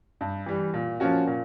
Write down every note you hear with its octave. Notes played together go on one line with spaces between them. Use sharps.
G2
E3 G3
A#2
F3 A#3 C#4 F#4
A#2